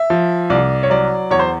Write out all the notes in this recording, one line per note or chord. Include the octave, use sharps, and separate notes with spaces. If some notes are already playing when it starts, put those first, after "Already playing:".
Already playing: E5
F3
C2 D5
C#5
F#3 D5
E2 C#5
C5